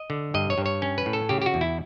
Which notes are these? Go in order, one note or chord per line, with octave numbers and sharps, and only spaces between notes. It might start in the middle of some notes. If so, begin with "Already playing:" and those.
Already playing: D#5
D3
G2 D#5
C#5
G2
C#5
C#4
B4
A2
A4
C#3 G4
G4
F#4
E2
E4